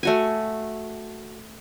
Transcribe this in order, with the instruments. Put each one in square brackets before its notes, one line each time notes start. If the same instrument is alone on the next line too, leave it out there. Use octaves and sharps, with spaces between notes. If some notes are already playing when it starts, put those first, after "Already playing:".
[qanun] A3 F#4 G#5